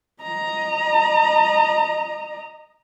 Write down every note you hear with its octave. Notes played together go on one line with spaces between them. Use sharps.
D#5 A#5